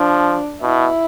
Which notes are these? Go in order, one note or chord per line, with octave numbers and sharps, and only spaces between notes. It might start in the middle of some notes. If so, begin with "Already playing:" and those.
Already playing: F3 D4
B2 E4